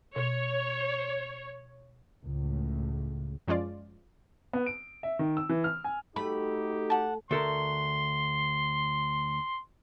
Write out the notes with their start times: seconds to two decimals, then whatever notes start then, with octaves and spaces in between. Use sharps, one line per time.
0.16 B2 C#5
2.23 C#2 A2
3.48 F#2 F3 G#3 C#4 F4 D5
4.53 B3
4.66 D7
5.03 E5
5.19 D#3
5.37 E6
5.49 E3
5.64 F6
5.84 G#5
6.16 A3 D#4 F#4 G4 B5
6.90 F#5 A5
7.31 D2 A4 A#4 C6